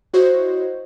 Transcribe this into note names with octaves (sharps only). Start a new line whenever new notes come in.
E4 F#4 C5 C#5 D#5